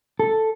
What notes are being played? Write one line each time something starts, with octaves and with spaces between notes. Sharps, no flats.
A4